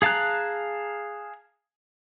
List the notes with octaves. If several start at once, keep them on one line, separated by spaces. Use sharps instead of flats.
G#4 F5 A5 A#5 F#6